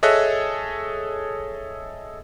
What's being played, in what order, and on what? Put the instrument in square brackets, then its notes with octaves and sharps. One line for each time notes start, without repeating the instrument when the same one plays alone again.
[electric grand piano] G#4 A4 C#5 D#5 E5 F#6